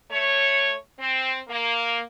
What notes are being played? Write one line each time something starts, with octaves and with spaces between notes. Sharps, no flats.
A3 C#5
C4
A#3